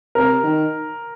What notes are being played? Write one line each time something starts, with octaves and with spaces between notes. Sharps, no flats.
C3 A#4
D#3